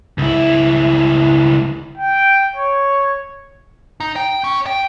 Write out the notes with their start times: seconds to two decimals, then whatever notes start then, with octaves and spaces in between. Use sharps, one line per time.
0.18 C#2 E4
1.97 G5
2.56 C#5
4.00 D#4
4.16 G5
4.44 C#4
4.66 G5